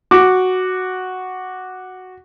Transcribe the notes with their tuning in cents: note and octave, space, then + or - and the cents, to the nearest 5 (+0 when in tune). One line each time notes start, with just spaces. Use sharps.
F#4 +0 D6 +0